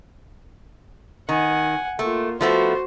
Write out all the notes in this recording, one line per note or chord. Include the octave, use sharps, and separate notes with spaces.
D#3 F#5 G#5
A3 A#3 F4
F3 A3 B3 F#4 C5